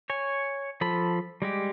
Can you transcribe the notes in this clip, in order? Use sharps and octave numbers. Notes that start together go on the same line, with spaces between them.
C#5 G#5
F3 A4 B5
G3 G#3 G4